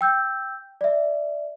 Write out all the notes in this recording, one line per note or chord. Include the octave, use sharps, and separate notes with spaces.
G5 E6 G6
D5 E5